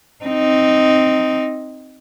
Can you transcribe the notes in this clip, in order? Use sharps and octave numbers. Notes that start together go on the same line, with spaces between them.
C4 D#4